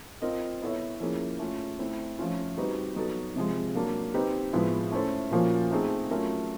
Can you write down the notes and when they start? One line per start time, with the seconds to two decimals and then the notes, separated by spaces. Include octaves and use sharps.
0.22 C4 F4 A#4 D#5
0.62 B3 E4 A4 C#5 E5
1.00 F3 A#3 C#4 E4 G#4
1.39 A3 C#4 F4
1.79 A3 C4 E4
2.19 F3 A3 C#4 F4
2.58 G3 C4 D#4 F#4 B4
2.96 F#3 B3 D#4 F#4 A4
3.36 C3 F3 G#3
3.75 F#3 A#3 D4
4.14 C4 D#4 G4 B4
4.53 A2 F3 G#3 B3 E4
4.92 A3 C#4 E4 A4 C5
5.31 A#2 F3 A#3 C#4 F#4
5.71 A3 C4 D#4 G#4
6.11 F#3 A3 C#4 F4 A#4